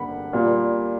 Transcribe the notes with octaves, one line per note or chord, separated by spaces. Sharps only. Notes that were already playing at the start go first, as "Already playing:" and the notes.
Already playing: G2 D3 A#3 F#5 B5
A#2 G3 A#3